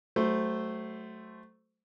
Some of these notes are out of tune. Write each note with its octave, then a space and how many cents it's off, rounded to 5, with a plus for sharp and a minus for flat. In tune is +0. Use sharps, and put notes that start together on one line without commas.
F#3 +30 A3 +0 C5 -10